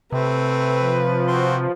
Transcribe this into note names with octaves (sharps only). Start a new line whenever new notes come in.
C3 A3 C4 B4
F3
C4 F#4 C6